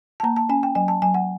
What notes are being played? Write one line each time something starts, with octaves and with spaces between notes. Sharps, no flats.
A5
A#3 A#5
A5
C#4 G#5
G5
F#3 G#5
A5
F#3 G#5
F#5